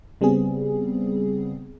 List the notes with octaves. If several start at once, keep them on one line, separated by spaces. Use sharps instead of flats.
C#3 G3 B3 C4 G#4